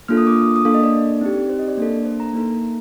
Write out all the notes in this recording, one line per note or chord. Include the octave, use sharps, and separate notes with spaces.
A#3 D4 F4 A4 F6
D#6
D6
D#6
D#6
A#3 D4 A4 F5
D#5
D5
C4 D#4 G4
C5
D#5
D5
A#3 D4 A4
C5
A#5
A#3 D#4 A4